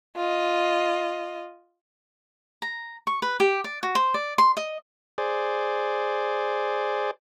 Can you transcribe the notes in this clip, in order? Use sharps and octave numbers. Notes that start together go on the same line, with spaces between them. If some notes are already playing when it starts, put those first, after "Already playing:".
F4 D#5
A#5
C#6
B4
G4
D5
F#4
C5
D5
C6
D#5
G#4 C5 D5